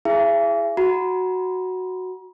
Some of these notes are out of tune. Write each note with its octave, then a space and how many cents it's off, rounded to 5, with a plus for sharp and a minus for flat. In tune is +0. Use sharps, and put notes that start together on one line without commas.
E4 +10 G#4 +0 E5 +45
F#4 +0 A#5 +40